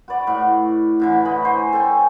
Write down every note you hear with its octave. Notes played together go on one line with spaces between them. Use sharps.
F#4 B4 D5
A2 F#4
A2 D3 E3
C#5 D#5 F#5 B5
C5 G#5
A4 C#5 G5 G#5